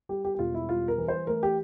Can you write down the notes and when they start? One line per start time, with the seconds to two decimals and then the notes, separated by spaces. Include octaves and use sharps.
0.09 G3 G4
0.25 G4
0.35 G4
0.39 E1 F4
0.54 E4
0.69 G3 F4
0.88 A#4
0.98 E3
1.08 C5
1.27 A3 A#4
1.43 G4